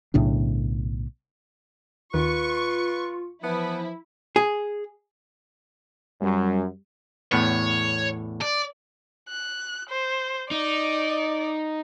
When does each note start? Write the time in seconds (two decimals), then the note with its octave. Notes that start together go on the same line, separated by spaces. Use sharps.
0.14 B1 A2 C#3 D4
2.14 D#2 D#3 F4 B4 C#6
3.44 E3 F3 B3 E4
4.36 G#4
6.21 F#2 G3
7.32 E2 A2 B3 C#5
8.41 D5
9.29 F#6
9.89 C5
10.51 D#4 D5